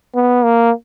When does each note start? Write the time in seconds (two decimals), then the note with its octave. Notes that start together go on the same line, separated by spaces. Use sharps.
0.15 B3
0.44 A#3